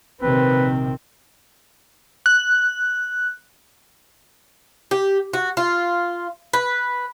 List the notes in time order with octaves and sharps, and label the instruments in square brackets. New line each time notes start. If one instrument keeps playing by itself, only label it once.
[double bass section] A#1 C3 D#3 [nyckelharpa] C4 [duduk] B4
[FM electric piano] F#6
[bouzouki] G4
F#4
F4
B4